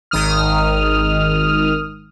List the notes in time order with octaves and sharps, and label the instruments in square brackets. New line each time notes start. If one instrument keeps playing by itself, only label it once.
[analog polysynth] G#1 D#3 D#6 F6